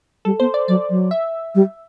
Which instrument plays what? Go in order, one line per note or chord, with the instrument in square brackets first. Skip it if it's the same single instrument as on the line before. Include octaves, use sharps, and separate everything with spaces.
[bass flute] G3 [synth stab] A4
[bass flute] B3 [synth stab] C5
[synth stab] D5
[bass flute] F#3 [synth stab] D5
[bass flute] F#3
[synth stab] E5
[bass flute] G3